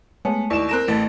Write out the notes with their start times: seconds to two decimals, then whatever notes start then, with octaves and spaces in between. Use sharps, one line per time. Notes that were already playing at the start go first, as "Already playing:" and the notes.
0.25 G#3 A3 B3 C#5
0.50 D#2 E4 D5 C#6 E7
0.69 C4 A#4 F#6 A#6 E7
0.88 A1 A3 A6 B6